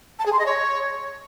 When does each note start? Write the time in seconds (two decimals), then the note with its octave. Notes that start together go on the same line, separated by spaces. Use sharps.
0.19 A5
0.26 G#4
0.32 C6
0.39 D#5
0.46 C#5